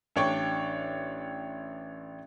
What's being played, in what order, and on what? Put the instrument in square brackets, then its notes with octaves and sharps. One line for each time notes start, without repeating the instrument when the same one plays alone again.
[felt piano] A1 D4 C#5 D5 G5 C#6